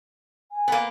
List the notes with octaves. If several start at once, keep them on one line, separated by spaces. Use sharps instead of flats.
G#5
A#3 B3